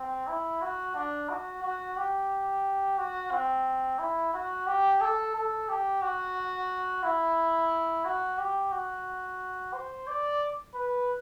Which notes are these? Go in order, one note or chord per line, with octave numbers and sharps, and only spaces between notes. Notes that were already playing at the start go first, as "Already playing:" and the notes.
Already playing: C4
E4
F#4
D4
F#4
F#4
G4
F#4
C4
E4
F#4
G4
A4
A4
G4
F#4
E4
F#4
G4
F#4
C5
D5
B4